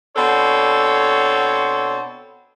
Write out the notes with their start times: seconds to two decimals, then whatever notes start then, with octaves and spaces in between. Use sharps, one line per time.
0.16 B2 C4 D4 A4 C#5